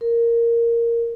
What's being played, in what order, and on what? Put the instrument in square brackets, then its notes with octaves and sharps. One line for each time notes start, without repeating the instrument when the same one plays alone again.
[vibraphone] A#4